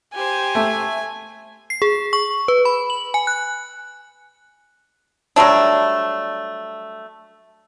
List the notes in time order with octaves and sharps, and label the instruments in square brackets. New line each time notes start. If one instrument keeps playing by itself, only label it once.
[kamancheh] G4 C5 [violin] G#5
[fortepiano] A3
[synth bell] C7
G#4
C#6
B4
B5
F#7
G#5
F#6
[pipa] F#3 G3 A3 D4